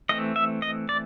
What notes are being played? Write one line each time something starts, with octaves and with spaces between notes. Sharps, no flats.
E3 A3 C4 D#5
E5
D#5
D5